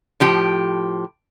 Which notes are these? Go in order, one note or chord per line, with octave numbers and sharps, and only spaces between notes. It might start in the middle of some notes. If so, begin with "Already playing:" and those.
A2 F3 G4